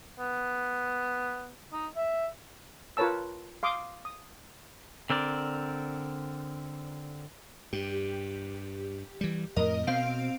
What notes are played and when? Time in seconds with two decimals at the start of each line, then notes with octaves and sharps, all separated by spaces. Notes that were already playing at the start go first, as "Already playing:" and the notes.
0.19 B3
1.73 D#4
1.96 E5
2.97 F4 A#4 B4 C#5 A5 E6
3.63 F5 C6 D6 D#6
4.05 D#6
5.10 D3 C4 A#4 D5
7.73 G2 G4
9.21 E3 G3
9.56 F2 A2 A#4 D#5
9.87 B2 C4 F5 D7